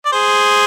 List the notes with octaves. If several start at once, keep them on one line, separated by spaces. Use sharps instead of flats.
D5
G#4 C5